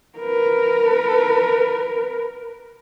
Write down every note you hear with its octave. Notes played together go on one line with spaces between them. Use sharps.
A#4 B4